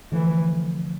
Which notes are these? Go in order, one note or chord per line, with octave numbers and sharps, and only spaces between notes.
D3 E3 F3 A3